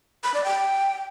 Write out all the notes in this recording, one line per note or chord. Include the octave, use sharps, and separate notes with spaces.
B5
D5
G5